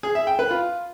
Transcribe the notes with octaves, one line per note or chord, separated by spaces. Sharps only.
G#4
E5
G5
B4
F4